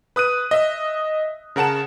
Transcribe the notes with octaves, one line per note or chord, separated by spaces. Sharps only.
B4 D#6 F#6 D#7
D#5 E5
C#3 A#4 F#5 A5 E7